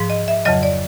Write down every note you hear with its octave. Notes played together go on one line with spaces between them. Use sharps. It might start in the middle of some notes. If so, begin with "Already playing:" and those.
Already playing: G#2 F3
D#5
E5
F2 C#3 F#3 D#5
D5